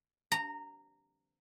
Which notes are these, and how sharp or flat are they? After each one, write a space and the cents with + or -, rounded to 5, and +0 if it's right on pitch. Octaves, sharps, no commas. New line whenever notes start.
A#5 -15